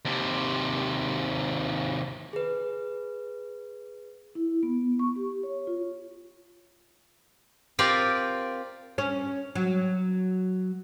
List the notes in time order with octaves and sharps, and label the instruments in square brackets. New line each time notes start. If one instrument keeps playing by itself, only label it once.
[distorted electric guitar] D#2 C3
[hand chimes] G#4 B4
[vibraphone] E4
B3
C#6
G4
C#5
F4
[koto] C4 F4 G4 A#4 D5 F5
[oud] C#4
F#3